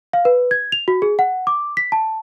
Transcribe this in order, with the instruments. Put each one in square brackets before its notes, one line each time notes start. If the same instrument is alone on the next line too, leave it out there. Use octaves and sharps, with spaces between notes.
[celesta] F5
B4
G#6
F7
F#4
G#4
F#5
D6
B6
A5